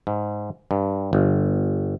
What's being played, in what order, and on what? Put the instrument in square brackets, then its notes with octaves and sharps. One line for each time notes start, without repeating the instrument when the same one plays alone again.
[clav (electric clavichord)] G#2
G2
G1